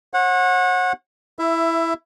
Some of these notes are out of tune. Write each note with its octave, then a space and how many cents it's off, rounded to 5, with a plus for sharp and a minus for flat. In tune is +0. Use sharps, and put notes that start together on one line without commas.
C#5 -45 F#5 -20
E4 +0 E5 +15